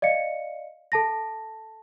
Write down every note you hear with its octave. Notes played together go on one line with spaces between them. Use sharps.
D5 D#5 F5 C#7
A4 A5 A#6